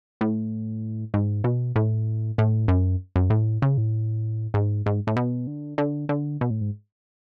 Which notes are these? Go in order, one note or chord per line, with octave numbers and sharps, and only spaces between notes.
A2
G#2
B2
A2
A2
F#2
F#2
A2
C#3
A2
G#2
G#2
A2
B2
D3
D3
D3
B2
A2
G#2